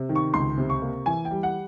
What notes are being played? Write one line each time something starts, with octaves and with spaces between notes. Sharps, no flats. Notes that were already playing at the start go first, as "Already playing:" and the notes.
Already playing: C3
D#3
C#6
C#2 C6
C3
C#6
A#3
E3 G#5
G5
G3
F#5